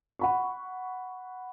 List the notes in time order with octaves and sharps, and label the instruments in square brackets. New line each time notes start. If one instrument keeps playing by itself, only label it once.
[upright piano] F#5 B5 C#6